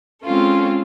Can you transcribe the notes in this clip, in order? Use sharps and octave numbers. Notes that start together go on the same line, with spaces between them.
G#3 C4 C#4 F4 A4